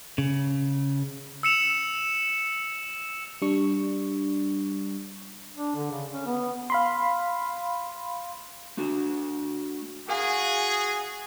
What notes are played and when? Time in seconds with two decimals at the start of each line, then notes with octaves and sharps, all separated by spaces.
0.18 C#3
1.43 E6 C#7 E7 F7
3.42 G3 D4 C#6
5.56 D4
5.76 D3
5.91 C#3
6.13 C#4
6.26 B3
6.70 F5 B5 C6
8.77 A3 D4 F#4
10.08 F#4 G#4 A#4 F5 G#5